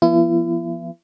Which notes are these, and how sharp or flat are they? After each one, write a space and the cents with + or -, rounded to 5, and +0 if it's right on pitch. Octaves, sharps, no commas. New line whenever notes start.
F3 -30 B3 -25 E4 +40